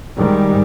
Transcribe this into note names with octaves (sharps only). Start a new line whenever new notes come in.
G#2 D#3 G3